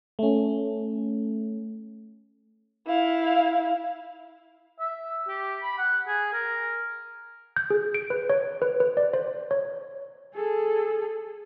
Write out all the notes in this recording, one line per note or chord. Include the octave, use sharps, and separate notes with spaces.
A3 C#4
E4 F5
E5
G4
B5
F#5
G#4
A#4
G6
G#4
D7
B4
C#5
B4
B4
D5
C5
C#5
G#4 A4